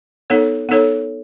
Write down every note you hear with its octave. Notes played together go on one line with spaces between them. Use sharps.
B3 D#4 A4 C#5
B3 D#4 A4 C#5